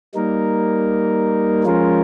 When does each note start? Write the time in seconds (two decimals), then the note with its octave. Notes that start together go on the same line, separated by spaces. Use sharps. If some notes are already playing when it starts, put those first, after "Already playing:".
0.15 G3 A#3 D#4 A#4
1.64 F3 G#3 C#4 F4 A#4